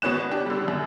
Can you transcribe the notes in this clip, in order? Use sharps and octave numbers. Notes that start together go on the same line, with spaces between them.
G#1 B2 B3 C#4 F#6 E7
D4 G4
D3 G3
F#2